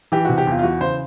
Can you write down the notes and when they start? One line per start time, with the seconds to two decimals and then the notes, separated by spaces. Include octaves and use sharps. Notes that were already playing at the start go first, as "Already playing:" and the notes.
0.12 E3 G4
0.25 C3 F#4
0.38 G4
0.47 E2 F4
0.59 F4
0.63 E3 F#4
0.81 C#3 C5